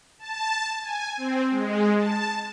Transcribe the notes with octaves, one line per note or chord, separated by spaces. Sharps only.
A5
G#5
C4
G#3
A5